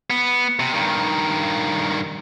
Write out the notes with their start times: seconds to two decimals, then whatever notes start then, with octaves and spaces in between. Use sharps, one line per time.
0.10 B3
0.60 C3
0.74 G2 D#3